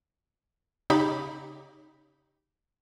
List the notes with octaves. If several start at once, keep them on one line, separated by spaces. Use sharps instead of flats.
C#3 D#4 G4 B5 D6